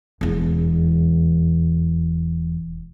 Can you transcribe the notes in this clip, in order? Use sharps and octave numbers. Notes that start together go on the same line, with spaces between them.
E1 E2